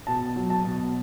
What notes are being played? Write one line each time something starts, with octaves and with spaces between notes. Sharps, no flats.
B2 A5
F#3
A5
B2